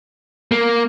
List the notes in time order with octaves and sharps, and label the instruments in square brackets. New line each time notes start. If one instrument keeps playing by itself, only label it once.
[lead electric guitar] A#3